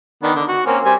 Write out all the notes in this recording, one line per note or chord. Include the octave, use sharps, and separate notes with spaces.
D#3 B3 D4
D3
F#4
A#3 C4 C#4
G3 C4 G#5